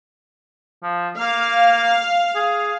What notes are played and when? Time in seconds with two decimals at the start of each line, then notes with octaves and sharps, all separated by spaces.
0.83 F3
1.19 A#3 F5
2.35 G#4